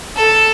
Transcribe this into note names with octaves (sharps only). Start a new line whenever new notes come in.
A4